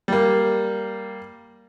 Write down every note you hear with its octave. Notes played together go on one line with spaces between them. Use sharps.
G3 A#3